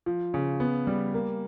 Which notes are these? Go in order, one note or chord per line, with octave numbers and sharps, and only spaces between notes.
F3
C#3
B3
G3
A#3